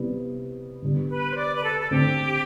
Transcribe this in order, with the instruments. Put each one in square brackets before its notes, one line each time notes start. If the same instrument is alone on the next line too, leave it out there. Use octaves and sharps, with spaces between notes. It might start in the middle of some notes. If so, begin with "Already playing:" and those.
Already playing: [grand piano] C3 G3 B3 E4
D3 G3 B3
[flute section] B4
C5
D5
B4
A4
A4
[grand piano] D3 A3 C4 [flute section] G4